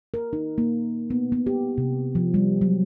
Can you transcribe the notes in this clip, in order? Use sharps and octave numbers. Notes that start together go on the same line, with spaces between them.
A#4
D#4
A#3
B3
B3
G4
C3
F3
G3
F#3